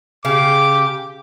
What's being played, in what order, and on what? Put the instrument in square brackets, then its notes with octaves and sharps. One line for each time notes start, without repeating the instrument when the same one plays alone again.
[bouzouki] C#3 [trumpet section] G4 D6